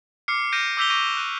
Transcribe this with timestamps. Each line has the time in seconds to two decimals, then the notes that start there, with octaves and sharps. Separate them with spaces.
0.28 D6 F6 C7 C#7
0.52 F6 G6 A#6 D7 D#7
0.77 D6 E6 G6 B6 F7 G7
0.90 C#6 D6 A#6 D7 D#7
1.17 F#6 D#7